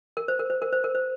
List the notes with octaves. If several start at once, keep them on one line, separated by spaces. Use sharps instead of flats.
A#4
C5
A#4
C5
A#4
C5
A#4
C5